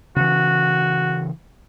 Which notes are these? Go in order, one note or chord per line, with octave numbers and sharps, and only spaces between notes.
C#3 E3 F#4